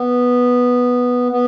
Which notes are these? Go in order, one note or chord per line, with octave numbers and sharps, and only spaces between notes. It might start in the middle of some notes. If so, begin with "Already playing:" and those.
Already playing: B3
B3